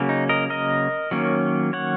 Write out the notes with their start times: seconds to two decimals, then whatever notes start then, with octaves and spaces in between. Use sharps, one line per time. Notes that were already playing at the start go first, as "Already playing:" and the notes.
Already playing: C#3 F#3 A#3 C#4
0.09 D#4
0.29 A#4 D#5
0.50 A#4 D#5
1.11 D#3 F#3 A#3 C#4
1.73 C#5 F#5